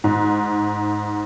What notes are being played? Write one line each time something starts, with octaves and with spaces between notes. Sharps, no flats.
G#2